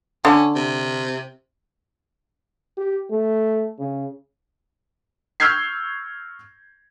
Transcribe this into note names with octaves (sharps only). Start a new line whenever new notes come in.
D3 C#4
C3
G4
A3
C#3
C#6 E6 F6 G6 G#6 C7